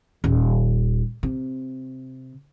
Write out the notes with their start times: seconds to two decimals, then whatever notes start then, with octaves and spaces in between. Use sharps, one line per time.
0.24 D#1
1.23 C3